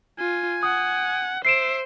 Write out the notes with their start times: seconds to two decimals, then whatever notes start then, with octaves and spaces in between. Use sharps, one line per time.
0.19 F4 G#5
0.63 F#5 D#6
1.45 C5 E5 C7 D7 E7